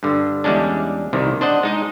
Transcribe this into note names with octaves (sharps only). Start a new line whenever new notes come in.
G2 D3
E2 G3 G#3 C#4 D4
C2 C3 D#3
D4 C5 D#5 F#5
G#3 D#4 D#5